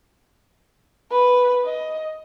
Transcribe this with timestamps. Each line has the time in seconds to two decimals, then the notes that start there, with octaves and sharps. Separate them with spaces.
1.12 B4
1.64 D#5